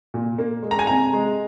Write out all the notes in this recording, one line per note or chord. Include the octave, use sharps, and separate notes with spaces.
A#2
A#3
G#3
A#5
G#5
C3 A#5
G#3